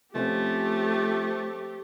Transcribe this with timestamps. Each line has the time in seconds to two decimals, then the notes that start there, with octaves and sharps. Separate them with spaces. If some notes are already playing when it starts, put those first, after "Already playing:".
0.15 F3 A3 C4 C#4 G4